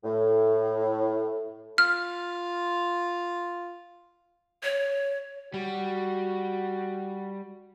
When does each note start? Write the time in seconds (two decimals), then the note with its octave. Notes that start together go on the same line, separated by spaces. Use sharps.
0.04 A2
1.78 F4 F6
4.63 C#5
5.54 G3 F#4